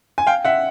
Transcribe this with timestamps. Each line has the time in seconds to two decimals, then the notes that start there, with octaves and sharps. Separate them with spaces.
0.18 G#5
0.27 F5 G5
0.45 E5 F#5